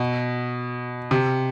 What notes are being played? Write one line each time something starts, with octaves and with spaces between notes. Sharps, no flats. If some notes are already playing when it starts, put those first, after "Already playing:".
Already playing: B2
C3